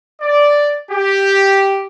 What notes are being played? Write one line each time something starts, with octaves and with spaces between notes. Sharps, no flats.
D5
G4